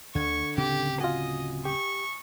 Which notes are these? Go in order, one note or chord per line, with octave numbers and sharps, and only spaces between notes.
D2 D3 C#6 G#6
D1 C#3 C4 G4
F4 F#4 D#5 G#5 D#6
G4 C#6